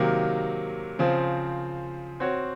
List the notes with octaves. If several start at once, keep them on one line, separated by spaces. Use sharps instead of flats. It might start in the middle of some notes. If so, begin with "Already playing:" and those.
Already playing: C3 D#3 F#3 A#3
C#3 F3 C4
C4 F#4 C#5